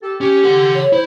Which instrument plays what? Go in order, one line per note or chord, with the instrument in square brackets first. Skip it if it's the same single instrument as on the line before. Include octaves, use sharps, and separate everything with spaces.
[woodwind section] G4 A4
[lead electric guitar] C#4 [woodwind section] G4
[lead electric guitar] A4 F#5
[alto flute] C#5
[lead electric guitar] E4 [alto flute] C5